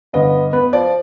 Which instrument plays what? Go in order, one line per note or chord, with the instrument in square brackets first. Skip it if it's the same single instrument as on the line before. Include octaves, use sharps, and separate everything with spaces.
[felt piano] G1 D#5 [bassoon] B3
[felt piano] B3 [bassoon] B4
[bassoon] F3 [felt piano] D5